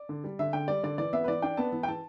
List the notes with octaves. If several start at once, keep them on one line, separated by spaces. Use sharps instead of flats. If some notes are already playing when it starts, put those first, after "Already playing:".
Already playing: D5
D3
G3
D3 E5
D3 G5
G3 D5
D3 D5
E3 D5
B3 E5
B4
E3 D5
D4 G5
B3 A5
E3
G5
E3 A5